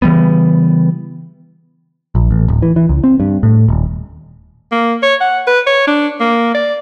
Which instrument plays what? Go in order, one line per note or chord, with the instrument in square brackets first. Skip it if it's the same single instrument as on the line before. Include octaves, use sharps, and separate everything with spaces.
[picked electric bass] C#3 E3 G3 B3
A#1
A1
D1
E3
E3
C#2
C4
G2
A2
D#1
[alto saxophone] A#3
C#5
F#5
B4
C#5
D4
A#3
D5